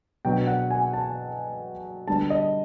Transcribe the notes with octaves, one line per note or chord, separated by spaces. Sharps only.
B2 F#3 B3 D4 G5
F#5
G#5
A5
D3 G3 B3 D4 A5
D#5